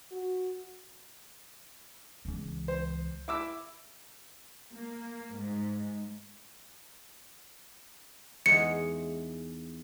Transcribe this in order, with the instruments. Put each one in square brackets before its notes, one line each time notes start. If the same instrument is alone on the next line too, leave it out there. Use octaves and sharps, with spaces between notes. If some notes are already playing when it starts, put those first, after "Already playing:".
[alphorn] F#4
[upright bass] C#2 E3
[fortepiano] C5
E4 D6 E6
[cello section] A#3
G#2
[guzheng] E2 G#3 D#4 [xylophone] C#7